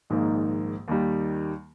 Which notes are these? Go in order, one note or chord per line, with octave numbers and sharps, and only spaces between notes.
A#1 G#2 D#3 A#3
D#2 D#3 G3